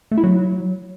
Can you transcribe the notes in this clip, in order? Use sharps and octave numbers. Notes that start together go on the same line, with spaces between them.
A3
E4
F#3